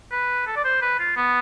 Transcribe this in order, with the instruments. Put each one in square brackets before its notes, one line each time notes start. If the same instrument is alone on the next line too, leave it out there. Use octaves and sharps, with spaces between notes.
[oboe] B4
A4
D5
C5
B4
F4
B3